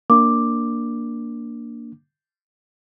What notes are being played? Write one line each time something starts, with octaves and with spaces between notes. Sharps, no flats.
A#3 D4 D6